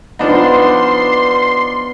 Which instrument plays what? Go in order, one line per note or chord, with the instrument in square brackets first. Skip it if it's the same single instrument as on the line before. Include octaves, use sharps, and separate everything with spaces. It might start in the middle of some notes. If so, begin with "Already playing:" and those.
[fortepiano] F3 D4 D#4 [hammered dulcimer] B3 [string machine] C6